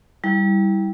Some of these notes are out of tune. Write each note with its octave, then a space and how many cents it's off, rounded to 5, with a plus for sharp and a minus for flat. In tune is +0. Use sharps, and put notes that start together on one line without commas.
G3 +0 E4 -20